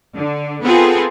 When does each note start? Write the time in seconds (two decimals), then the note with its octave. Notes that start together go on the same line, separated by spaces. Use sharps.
0.14 D3
0.62 B3 C4 F4 G#4 A4